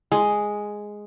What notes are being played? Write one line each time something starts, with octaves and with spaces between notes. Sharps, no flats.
G#3